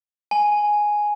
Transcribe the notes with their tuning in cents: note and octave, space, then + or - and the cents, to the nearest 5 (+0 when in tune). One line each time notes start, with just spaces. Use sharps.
G#5 +5